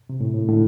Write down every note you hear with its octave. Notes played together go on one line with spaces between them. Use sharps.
C3
A2
A2
A2 D3